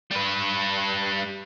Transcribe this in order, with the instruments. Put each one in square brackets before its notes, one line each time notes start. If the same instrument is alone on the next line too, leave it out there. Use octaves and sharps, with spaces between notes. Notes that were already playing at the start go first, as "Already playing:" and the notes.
[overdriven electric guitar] G3 B4